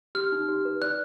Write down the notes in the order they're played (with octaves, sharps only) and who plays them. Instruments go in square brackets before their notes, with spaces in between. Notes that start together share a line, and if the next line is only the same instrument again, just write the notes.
[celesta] G4 [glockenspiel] F6
[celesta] D#4
G4
B4
[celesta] D5 [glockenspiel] F#6